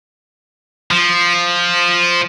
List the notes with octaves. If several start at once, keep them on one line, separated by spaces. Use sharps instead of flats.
F3